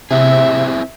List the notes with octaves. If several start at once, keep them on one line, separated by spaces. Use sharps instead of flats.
C3 C4 E4 G#4 E5